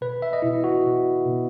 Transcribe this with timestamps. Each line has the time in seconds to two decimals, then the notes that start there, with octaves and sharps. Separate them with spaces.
0.01 B2 B4
0.22 E5
0.33 D#5
0.42 B2 E4
0.64 F#4
0.84 B2
1.25 B2